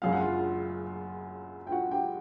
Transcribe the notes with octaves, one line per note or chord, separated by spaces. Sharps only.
F#1 F#2 C#3 F5
F#5
F4 F5
G5
F#4 F#5
G4 G5